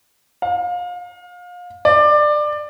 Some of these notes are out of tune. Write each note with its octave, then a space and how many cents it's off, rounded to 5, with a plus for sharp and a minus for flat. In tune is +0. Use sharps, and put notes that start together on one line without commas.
F5 +30
D5 +20